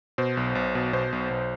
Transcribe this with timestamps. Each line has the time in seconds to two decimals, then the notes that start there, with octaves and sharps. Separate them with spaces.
0.18 B2 C5
0.37 B1
0.55 B1
0.75 B2
0.93 B2 C5
1.12 B1
1.31 B1